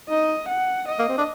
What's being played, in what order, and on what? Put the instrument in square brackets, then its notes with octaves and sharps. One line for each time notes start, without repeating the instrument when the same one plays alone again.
[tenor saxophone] D#4 [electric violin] D#5
[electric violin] F#5
D#5
[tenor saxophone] A#3
C4
D4